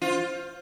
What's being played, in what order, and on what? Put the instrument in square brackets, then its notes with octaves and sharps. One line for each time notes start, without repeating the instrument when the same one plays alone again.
[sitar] F4 [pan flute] C5